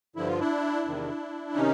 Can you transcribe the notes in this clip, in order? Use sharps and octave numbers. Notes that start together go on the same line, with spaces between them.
G2 D3 F3 E4
F4
D4 E4
E2 C3 D#3
C3 D#3 C#4 D#4